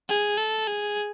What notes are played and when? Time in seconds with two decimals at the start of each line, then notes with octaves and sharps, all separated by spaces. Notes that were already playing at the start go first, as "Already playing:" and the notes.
0.09 G#4
0.37 A4
0.67 G#4